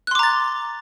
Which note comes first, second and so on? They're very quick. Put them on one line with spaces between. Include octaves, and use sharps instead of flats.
F#6 C6 D6 A#5 A6